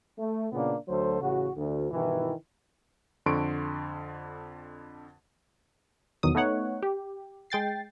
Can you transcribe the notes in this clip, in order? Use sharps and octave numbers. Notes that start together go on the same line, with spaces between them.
A3
A#2 C#3 A#3 B3 D4
D2 F#3 A4 C5
A1 C#3 F#4
D2
G2 B2 D#3 E3
F2 D3 C6 C#6 D7
E2 B2 D#3 F#3 D#6
A3 B3 D#4 C#5 F#5
G4
G#3 G5 A6 C7